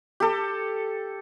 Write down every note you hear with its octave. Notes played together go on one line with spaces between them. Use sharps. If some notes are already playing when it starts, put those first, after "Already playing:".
G4 A4